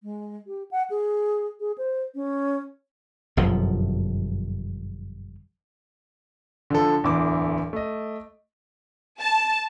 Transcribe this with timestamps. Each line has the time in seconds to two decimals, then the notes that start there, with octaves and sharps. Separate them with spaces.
0.03 G#3
0.47 G4
0.71 F#5
0.90 G#4
1.60 G#4
1.78 C5
2.15 C#4
3.37 G1 F#2 B2 F3
6.70 D3 F3 A4
7.03 D1 E2 D3 E4 D6
7.73 A3 D#5
9.20 A5